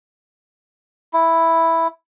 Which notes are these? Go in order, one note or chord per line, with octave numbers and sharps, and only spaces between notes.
E4